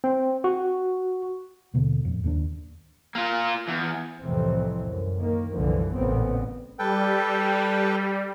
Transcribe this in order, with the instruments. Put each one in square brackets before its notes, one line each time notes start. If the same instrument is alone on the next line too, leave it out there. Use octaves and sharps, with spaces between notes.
[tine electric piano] C4
F#4
[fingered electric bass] D#2 B2 D3
F2 A2
D#2 D#3 A3 D4
[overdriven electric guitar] A#3 F4
E2
[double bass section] C2 F2 A2 C3 E3 C4
F#2
D#3 A#3
C2 F#2 D3 E3 F3
A1 A#2 C#3 B3 C4
[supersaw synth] G3 [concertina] A4 B4 G5